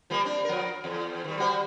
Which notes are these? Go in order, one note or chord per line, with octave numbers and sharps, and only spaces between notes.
F3 G3 A#3
C4 D4
F3 A#4
E2
D#3 G3
G3 F#4 C5